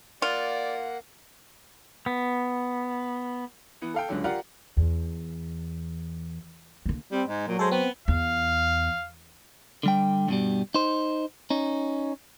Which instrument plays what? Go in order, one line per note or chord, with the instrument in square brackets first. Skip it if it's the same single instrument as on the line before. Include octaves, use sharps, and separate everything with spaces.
[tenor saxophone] A#3 [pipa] F4 [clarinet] D5 [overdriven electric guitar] F#5
[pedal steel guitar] B3
[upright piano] E3 B3
A4 F5 G5
C#2 D3 F#3
F4 G4 A#4 D5 F5 F#5
[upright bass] E2
D3 A#3
[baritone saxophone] G3 [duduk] C4
[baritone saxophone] G#2 [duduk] G#3
[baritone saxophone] A#2 [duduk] F#3
[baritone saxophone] G#3 [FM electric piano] A4 C5
[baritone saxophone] B3 [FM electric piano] C4
[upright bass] E2 [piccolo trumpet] F5
[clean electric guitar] D3 G3 G5
G2 B2 G3
D#4 C5
C#4 D#4